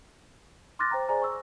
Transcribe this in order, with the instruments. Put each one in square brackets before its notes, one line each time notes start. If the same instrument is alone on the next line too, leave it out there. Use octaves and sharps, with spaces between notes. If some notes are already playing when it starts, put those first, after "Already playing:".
[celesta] C6 D6 F6 F#6 A6 A#6
C5 G5 A#5
G#4 C5 D5 G#5 A#5
C#6 E6